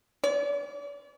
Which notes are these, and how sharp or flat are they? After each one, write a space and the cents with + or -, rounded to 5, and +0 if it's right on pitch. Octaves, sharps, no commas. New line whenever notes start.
D5 -45